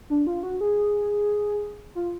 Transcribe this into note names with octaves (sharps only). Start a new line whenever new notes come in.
D4
F4
F#4
G#4
F4